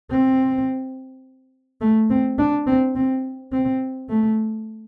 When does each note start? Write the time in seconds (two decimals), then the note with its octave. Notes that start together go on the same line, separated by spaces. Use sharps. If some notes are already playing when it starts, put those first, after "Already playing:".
0.10 C4
1.81 A3
2.10 C4
2.38 D4
2.67 C4
2.95 C4
3.52 C4
4.09 A3